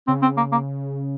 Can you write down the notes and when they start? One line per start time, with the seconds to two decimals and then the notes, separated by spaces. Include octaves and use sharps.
0.07 C#3 C4
0.22 C4
0.37 A#3
0.52 A#3